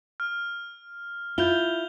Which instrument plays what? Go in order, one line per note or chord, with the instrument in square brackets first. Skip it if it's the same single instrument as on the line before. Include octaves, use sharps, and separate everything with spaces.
[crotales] F6
[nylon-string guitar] E4 F4 [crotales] G6 F7 G7